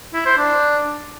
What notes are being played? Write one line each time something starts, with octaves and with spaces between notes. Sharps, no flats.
E4
C5
D4